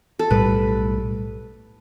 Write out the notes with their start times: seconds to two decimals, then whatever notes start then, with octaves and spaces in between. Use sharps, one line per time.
0.19 A4
0.30 B1 A2 G3 B4